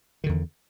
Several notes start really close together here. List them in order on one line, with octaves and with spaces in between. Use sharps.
D#3 D3 E2